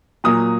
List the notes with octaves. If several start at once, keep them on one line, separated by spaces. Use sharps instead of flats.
A#2 F#3 A#3 D#6